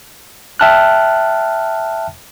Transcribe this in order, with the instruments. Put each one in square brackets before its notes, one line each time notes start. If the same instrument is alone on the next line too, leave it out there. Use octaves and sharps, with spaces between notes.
[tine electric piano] E5 G5 A5 F6 F#6